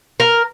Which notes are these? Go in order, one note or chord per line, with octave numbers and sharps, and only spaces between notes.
A#4